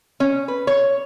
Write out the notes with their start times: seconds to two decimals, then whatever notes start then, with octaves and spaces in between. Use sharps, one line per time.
0.20 C#4
0.48 B4
0.67 C#5